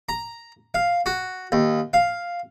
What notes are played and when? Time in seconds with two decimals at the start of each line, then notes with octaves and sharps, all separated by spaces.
0.09 A#5
0.74 F5
1.06 F#4
1.52 D#2
1.93 F5